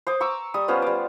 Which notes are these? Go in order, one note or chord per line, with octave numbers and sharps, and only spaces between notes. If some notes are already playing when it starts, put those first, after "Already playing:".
C5 D6 D#6
A#5 C#6 D6 E6
G3 D#6
B3 C#4 F4 C5
G3 D6